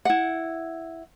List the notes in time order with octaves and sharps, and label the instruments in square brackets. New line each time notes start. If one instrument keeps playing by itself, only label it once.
[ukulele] E4 F#5